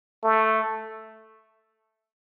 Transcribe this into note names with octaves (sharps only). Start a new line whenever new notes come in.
A3